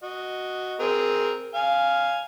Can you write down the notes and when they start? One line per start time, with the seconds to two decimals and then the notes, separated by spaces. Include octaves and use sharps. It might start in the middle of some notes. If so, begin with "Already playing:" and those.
0.03 F#4 D#5
0.80 C4 G#4 A#4
1.55 F5 G#5